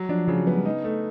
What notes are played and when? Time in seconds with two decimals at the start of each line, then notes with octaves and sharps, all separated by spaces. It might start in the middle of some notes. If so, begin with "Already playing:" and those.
Already playing: F#3
0.09 F3 D4
0.28 C#3 F3
0.37 F#3
0.47 B3
0.56 G3
0.65 G#3 D#4
0.84 A3